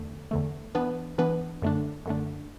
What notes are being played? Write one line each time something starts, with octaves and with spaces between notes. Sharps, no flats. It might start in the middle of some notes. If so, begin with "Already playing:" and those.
Already playing: E2 D3 A3
E2 D3 A3
E3 B3 D4 B4
E3 B3 D4 B4
F#2 D3 A3 D4
F#2 D3 A3 D4